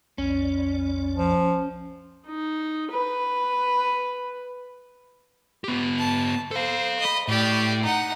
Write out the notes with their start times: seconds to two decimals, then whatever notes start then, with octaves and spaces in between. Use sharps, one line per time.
0.18 B1 F2 C#4 D5
1.17 F3
2.27 D#4
2.91 B4
5.64 B3 G4
5.99 A5
6.51 A4 C5 F5
7.00 D#5 B5
7.28 A2 G4 D5
7.84 D#4 F#5